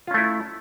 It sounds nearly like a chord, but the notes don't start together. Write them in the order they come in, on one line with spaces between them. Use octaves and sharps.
F4 C#4 A3 E4